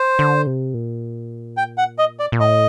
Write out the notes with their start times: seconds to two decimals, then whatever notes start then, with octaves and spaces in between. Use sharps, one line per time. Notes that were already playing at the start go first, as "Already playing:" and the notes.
Already playing: C5
0.19 D3
0.47 C3
0.74 A#2
1.57 G5
1.78 F#5
1.98 D#5
2.19 D5
2.32 A#2
2.40 A2 D#5